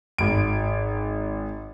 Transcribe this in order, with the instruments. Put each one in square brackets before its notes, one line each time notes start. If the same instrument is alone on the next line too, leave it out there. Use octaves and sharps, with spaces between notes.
[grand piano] G#1 D7